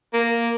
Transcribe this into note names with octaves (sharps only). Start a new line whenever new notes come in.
A#3